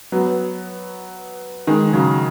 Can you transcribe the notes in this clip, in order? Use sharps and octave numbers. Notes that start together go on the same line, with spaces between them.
F#3 B3
D#3 G#3
C#3 F#3